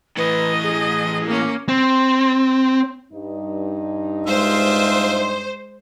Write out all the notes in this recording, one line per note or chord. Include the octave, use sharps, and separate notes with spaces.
A2 E3 B4 D#5
G#4
A#3 C#4
C4
G2 D#4
G#3 F4 C5 E5